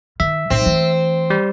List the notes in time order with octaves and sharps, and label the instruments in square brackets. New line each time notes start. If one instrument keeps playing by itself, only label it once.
[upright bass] D#3 [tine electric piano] E5
[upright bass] A1 D#4 [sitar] C4
[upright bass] E3 A3
[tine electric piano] G3